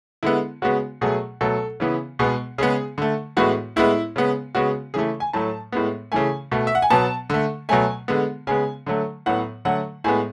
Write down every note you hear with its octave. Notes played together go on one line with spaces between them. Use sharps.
D3 G#3 B3 E4
C#3 G#3 B3 F#4
B2 F#3 A3 G#4
B2 F#3 A3 A4
C#3 E3 B3
B2 G#3 B3 G#4
C#3 G#3 B3 G#4
D3 A3
A2 E3 G#3 B3 F#4
A2 G#3 B3 E4
C#3 G#3 B3
C#3 G#3 B3 F#4
C#3 E3 A3 G#4
G#5
A2 F#3 A3 A5
A2 G#3 B3
C#3 E3 A3 G#5
B2 A3
E5
F#5
G#5
B2 F#3 B3 A5
D3 A3
B2 F#3 A3 G#5
D3 G#3 B3
C#3 G#3 B3 G#5
D3 F#3 A3
A2 F#3 B3 F#5
D3 F#3 A3 F#5
A2 G#3 B3 G#5